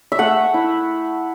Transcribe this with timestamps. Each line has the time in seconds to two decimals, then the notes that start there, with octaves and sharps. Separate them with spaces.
0.12 E5
0.19 A3 F#5
0.54 E4